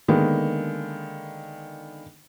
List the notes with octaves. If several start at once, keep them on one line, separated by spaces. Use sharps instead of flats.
D3 D#3 G#3 A#3 B3